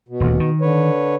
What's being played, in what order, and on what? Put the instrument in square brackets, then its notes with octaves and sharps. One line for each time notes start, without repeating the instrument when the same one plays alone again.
[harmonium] B2
[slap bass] D#1 D2
D#3
[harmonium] D3 B4 C#5